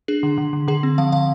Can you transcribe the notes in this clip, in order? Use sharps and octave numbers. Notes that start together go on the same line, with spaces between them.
D4 G#4
D3
D3
D3
D3 G#4
C4
F3 F5
D3 F5